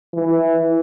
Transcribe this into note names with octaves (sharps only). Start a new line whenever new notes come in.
E3